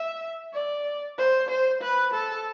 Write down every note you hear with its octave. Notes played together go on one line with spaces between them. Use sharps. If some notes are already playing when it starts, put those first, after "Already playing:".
Already playing: E5
D5
C5
C5
B4
A4